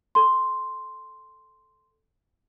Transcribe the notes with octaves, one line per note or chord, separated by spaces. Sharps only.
A4 C6